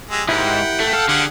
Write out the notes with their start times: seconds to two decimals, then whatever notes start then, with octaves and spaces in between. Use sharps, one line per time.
0.11 G#3 G4 E6
0.29 G#2 E4 G4 A#4 F#5 G5
0.80 A3
0.93 A4 F5
1.08 D3 G4 G#4 F#5